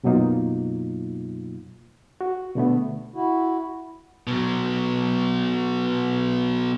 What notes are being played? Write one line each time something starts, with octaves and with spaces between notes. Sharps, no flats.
F#2 B2 F#3 A#3 D#4 F4
F#4
B2 D3 A3 B3
E4 F#4
B2 F#3